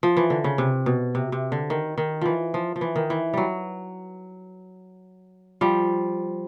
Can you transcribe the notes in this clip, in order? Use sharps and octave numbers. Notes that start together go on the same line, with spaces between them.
F3
E3
D3
C#3
C3
B2
C3
C3
D3
D#3
D#3
E3 F3
F3
F3
E3
D#3
E3
F#3 G3
F3 G3